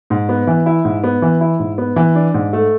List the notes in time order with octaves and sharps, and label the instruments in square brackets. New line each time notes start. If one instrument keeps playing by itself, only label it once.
[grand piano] G#2
B3
E3
E4
G#2
B3
E3
E4
G#2
B3
E3
D4
G#2
A3